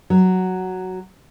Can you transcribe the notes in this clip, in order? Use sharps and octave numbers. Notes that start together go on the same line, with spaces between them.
F#3